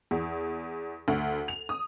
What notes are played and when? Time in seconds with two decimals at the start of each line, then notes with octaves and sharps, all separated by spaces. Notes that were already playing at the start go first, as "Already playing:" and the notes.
0.11 E2
1.08 D2
1.48 F7
1.69 D#6